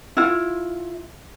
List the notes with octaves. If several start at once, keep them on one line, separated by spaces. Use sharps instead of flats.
E4 F4